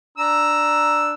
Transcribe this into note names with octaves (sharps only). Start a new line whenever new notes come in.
D4 A#5 E6